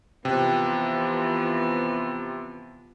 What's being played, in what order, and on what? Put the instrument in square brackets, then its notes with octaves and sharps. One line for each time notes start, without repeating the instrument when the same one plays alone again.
[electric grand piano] C3 [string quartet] E3 F3 B3 [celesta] G5 F#6